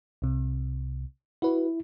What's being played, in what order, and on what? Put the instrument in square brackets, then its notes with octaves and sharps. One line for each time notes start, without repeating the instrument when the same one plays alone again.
[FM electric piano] C2 C3
[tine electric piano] E4 [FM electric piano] F#4 B4